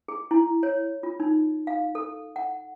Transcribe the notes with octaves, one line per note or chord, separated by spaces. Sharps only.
G#4
E4
C#5
F4
D#4
F5
A4
F#5